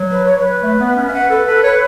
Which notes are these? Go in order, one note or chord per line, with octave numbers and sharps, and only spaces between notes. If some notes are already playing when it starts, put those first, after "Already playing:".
Already playing: F#3
B4
C#5
B4
A3
B3
C#4
E5
B4 F#5
A4 B4
A4 B4
B4 C#5